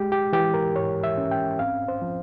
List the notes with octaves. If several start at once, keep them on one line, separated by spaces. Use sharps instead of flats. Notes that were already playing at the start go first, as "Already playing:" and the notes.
Already playing: G#3 G4
G4
E3 G4
A#4
G#2 C#5
E5
C#4
G5
C4 F5
C5
F3